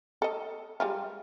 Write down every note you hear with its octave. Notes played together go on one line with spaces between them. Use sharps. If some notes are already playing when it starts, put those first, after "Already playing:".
A4 D#5
G3 G#3 F4